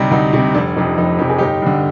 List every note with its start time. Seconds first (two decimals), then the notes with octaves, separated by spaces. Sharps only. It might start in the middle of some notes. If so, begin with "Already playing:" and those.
Already playing: D2 C3 G3 C4 D#4
0.11 D2 D#4
0.33 C3 G3 C4
0.54 F1 D4
0.76 F2 C3 D#4
0.98 F1 D#4
1.19 F2 C3 G4
1.29 G#4
1.38 G1 D#4 G4
1.62 G2 D3